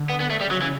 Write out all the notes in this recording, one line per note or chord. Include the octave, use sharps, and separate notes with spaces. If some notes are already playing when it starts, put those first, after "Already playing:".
Already playing: D3
B3
B3
A3
C#3 G3
F#3
E3